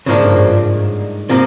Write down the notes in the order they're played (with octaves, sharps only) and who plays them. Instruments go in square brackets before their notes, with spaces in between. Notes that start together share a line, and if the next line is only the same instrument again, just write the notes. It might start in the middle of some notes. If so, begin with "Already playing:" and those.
[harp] G#2 [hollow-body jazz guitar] C#3 F3 A#3 D4
[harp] G2
G#2
[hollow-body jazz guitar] C3 F3 A#3